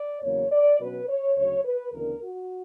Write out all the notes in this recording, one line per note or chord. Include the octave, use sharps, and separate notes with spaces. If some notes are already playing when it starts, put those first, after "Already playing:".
Already playing: D5
E2 C#3 F#3 A#3 C#5
D5
B2 F#3 C#4 B4
C#5
D2 C#3 F#3 C#5
B4
D2 C#3 E3 B3 D4 A#4
F#4